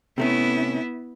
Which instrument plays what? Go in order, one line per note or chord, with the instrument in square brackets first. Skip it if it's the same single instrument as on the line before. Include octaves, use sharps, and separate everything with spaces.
[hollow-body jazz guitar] C3 A3 C#4 [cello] B3 E4